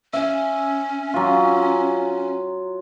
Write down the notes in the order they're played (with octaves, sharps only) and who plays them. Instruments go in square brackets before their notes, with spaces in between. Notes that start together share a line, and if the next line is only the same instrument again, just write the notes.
[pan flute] C#4 [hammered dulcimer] E5 G#5
[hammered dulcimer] F#3 F4